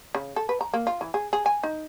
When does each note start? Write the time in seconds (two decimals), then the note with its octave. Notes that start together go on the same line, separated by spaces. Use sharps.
0.15 C#3
0.36 A4
0.49 B4
0.61 A#5
0.74 A#3
0.87 F4
1.01 E3
1.14 G#4
1.33 G#4
1.46 G#5
1.63 D#4